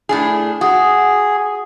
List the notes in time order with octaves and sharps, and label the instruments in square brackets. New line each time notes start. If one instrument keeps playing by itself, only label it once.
[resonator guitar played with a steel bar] A2 D4 G#4
[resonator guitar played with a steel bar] F#4 [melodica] G#4